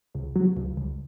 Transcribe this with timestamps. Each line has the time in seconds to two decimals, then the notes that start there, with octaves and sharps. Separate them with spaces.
0.15 C#2
0.36 F#3
0.57 C#2
0.77 C#2